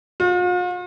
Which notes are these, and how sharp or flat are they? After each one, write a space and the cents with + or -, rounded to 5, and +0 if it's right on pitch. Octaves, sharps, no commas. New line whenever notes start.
F4 +45